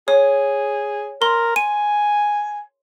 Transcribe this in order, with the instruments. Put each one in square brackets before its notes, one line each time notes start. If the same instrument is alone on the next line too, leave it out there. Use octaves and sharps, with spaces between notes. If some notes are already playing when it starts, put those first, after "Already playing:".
[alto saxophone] G#4 [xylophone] C#5
[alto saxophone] A#4 [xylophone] C6
[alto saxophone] G#5 [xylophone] D#7